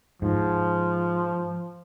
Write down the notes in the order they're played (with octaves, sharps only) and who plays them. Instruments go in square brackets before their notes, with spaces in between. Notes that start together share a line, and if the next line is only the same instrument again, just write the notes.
[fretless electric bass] G#2 [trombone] F3